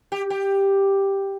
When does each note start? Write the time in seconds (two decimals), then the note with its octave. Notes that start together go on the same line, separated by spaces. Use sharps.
0.12 G4
0.30 G4